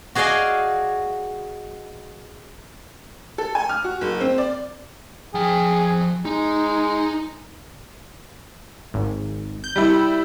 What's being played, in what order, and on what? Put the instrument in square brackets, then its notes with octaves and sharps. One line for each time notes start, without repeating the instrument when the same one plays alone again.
[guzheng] F#4 G#4 D5 D#5 F5 G#5
[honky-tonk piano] A4
G#5
F6
F#4
F#1
C4
D5
[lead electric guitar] F3 G5 [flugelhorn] G#4
[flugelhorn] G#3 [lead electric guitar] D#4
[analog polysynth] G#1
G6
[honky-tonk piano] G3 E4